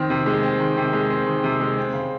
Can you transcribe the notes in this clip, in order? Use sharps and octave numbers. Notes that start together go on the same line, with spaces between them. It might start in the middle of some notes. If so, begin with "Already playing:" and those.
Already playing: D#3 C4
C3
G#3
C4
D#3
C3
G#3
C4
D#3
C3
G#3
C4
C#3